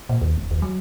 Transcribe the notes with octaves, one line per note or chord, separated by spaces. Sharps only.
A#2
D#2
D#1
D#2
F#3